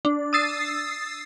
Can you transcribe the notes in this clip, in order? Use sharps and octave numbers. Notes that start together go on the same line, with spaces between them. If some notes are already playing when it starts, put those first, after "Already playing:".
D4
D#6 E6 A6 C7